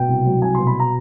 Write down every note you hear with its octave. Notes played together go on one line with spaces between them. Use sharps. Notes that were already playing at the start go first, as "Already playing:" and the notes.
Already playing: B2 G5
C2
F#3
C2 G#5
B2 C6
B5
A#5